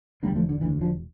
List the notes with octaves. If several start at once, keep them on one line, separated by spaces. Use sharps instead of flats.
E1 D2 D3 G3 A#3
F3 A3
D3
E1 D2 D3 E3
D3 F3